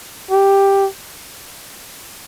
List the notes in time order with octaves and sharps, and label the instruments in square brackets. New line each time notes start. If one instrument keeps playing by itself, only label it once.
[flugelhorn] G4